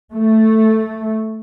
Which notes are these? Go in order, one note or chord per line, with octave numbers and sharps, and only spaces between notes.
A3